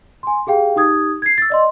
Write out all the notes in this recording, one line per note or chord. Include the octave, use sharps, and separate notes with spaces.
G#5 C6
G4 G#4 F5 G5
D#4 G4 D#6 G#6
G#6 C7
E6 A6
D5 D#5 C6